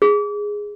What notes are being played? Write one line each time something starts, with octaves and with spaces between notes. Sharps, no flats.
G#4